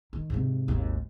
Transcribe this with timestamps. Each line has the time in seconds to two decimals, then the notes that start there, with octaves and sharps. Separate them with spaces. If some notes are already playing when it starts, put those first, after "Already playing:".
0.13 D#3
0.30 G#2 C3
0.68 G#1 D#2